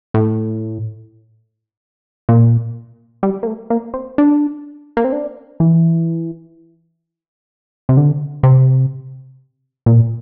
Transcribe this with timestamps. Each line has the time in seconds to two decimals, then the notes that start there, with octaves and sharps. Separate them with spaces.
0.14 A2
2.29 A#2
3.23 G3
3.43 A#3
3.47 A3
3.70 A#3
3.94 C4
4.18 D4
4.97 A#3
5.05 C4
5.12 D4
5.60 E3
7.89 C3
7.97 D3
8.43 C3
9.86 A#2